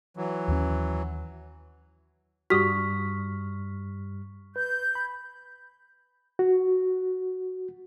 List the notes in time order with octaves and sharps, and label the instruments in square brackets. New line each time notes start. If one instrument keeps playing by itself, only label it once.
[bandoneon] E3 F#3
[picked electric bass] D#2 C#4
[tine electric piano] G2 G3 F6 [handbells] F#4 G4 D#6 [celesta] C#6 B6
[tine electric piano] B4 [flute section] G6
[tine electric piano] B5
[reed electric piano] F#4